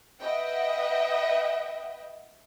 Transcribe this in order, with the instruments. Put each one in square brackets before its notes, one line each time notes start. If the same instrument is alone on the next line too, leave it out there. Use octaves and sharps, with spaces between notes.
[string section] B4 D#5 E5 F#5 G5